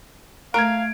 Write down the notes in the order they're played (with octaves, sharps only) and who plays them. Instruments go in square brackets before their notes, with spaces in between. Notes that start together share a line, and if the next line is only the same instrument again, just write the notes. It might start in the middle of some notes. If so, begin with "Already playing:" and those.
[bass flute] A3 [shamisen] A#4 [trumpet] F5 [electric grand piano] G#6 D7